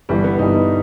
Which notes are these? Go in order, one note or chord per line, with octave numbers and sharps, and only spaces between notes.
G1 G2 E3 G3
B3
G1 G2 E3 D#4
D#4